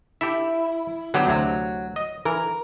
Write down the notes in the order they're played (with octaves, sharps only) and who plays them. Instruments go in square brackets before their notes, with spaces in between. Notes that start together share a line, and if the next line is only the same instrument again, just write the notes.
[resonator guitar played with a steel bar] E4 [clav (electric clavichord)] G4 A4 E5
[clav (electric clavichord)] D3 B3 G4 [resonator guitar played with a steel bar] F#3
[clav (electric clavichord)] D2 C3
D#5
[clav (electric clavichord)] E3 [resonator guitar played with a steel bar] A#4